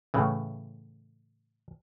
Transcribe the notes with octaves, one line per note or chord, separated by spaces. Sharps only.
A2 C#3 E3